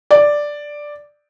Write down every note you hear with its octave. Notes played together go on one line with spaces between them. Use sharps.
D5